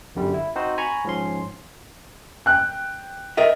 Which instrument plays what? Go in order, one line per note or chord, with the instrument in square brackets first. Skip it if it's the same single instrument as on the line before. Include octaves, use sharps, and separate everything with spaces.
[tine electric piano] G1 F#2 D3 G3
E4
C4 D#4 F#4 C5
G#5 A#5 B5 C#6
G#2 F3 C#4 C6
[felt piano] G5 F#6
[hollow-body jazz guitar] A#4 D#5 E5